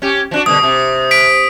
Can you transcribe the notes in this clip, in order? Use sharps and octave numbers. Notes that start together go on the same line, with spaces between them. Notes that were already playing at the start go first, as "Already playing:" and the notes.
C#4 G4
F3 D4 F#4
G2 B2 D3 D#6
C3
B6 D7